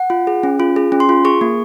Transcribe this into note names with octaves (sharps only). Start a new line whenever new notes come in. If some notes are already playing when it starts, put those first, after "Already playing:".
Already playing: F#5
F4
G#4
C#4
F4
G#4
C#4
C6
F4
G#4 C#6
A#3